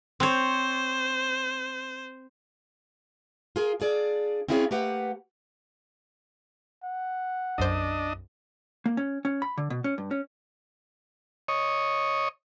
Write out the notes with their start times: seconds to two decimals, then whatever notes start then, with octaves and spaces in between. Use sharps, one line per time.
0.20 C4 C5 C#5
3.56 F4 G#4 A#4
3.80 D4 F4 G#4 D5
4.48 C4 C#4 E4 F4 G#4 C#5
4.71 A3 A#3 G4 B4 F#5
6.84 F#5
7.58 B1 F#2 D4 C5 D#5
8.86 A#3
8.97 C#4
9.25 C#4
9.42 B5
9.58 D3
9.70 B2
9.84 C#4
9.98 G2
10.11 C#4
11.48 C#5 D#5